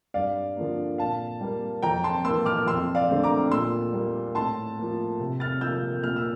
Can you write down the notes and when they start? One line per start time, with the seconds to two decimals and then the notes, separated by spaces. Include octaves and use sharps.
0.14 G2 D5 F5
0.57 D3 F3 A#3
0.98 A#2 F5 A5
1.40 G3 A#3
1.82 F2 G5 A#5
2.04 A5 C6
2.25 A#3 C6 E6
2.30 E3
2.46 D6 F6
2.67 F2 C6 E6
2.95 D5 F5
3.09 D3 A3 C4
3.23 A#5 D6
3.51 A#2 C6 E6
3.93 G3 A#3
4.35 A2 A5 C6
4.78 F3 A#3
5.20 C3
5.40 F6 A6
5.61 F3 A#3 E6 G6
6.04 A#2 F6
6.16 E6